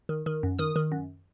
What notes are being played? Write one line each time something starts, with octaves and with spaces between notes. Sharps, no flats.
D#3
D#3
F#2
D#3 D#6
D#3
F#2